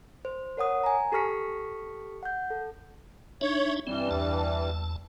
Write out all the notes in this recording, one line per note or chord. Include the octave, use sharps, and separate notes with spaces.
C5
A#4 C#5 F#5 D#6
G#5 A#5
G4 A4 C#6 F6 B6 C#7
F#5 G6
A4
D4 D#4 C#5 E5
G2 E3 G3 C4
E2 A5